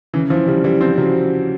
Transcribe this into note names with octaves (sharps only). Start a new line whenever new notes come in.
C#3 E3
E3 F3
C#3 G3
E3 G3
F3 C4
C#3 F#3